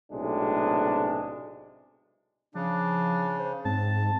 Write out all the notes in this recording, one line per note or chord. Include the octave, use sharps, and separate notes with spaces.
B1 A2 C3 G#3 D4
C#3 F3 D4
C5
G#2 C4 A5